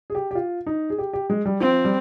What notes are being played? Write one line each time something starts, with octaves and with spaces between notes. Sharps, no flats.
G#4
G4
G4
F4
D#4
G#4
G4
G4
G#3
G3
F3 C4
G3